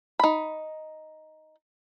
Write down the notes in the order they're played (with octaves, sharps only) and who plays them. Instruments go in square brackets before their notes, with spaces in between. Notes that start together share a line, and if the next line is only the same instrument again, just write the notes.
[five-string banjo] D#4 B5